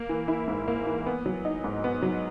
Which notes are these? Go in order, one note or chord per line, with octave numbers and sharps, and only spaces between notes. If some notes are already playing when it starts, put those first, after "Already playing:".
Already playing: A#3
E3
E4
G#2
A#3
E3
B3
F#3
D#4
G#2
B3
F#3